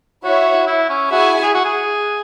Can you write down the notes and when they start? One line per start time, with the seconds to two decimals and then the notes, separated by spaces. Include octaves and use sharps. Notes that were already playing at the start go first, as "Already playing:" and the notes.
0.25 E4 F#4 C#5 E5
0.67 E4
0.90 C#4
1.10 E4 F#4 G#4 E5 G#5
1.43 G#4
1.55 F#4
1.65 G#4